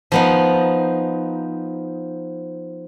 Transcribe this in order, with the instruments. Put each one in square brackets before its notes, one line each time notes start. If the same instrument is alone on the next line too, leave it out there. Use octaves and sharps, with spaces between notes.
[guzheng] F3 B3 D#4